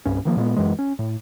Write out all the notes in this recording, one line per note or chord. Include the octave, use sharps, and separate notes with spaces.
C2 G2 C#4
D#3 F3 A#3
A#2 G3 G#3 B3
F#2 E3 G#3
C#4
A2